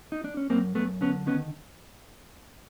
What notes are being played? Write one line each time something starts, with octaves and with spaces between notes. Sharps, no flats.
D#4
D4
C#4
F#2 A#3 C4
F#2 A3 B3
D3 B3 C#4
D#3 B3 C#4